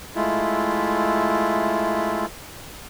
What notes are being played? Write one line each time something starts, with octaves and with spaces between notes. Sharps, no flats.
G#3 A3 E4 F4